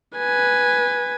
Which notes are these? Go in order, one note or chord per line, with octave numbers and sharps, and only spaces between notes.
B4 G#5